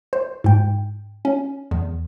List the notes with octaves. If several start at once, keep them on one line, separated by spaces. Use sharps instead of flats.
C5
G#2 G5
C#4
E2